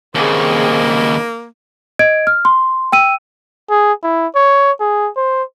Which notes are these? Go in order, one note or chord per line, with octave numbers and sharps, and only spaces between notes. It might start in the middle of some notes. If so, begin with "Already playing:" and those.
D#2 C#3 A#3 C4 G#4
D#5 G#6 D7
F6
C6
G5 E6 D#7
G#4
E4
C#5
G#4
C5